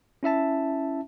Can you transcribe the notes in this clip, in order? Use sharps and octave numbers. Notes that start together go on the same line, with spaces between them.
C#4 E4 E5 A5